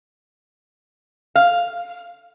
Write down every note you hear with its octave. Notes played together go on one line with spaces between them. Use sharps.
F5